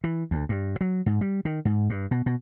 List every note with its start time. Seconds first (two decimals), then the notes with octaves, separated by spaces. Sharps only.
0.04 E3
0.31 D2
0.49 G2
0.81 F#3
1.06 G#2
1.21 G3
1.45 D#3
1.65 G#2
1.90 G2
2.11 B2
2.26 B2